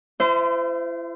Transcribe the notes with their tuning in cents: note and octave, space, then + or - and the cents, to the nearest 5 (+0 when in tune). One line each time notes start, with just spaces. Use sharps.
E4 +45 C5 -30 E5 +0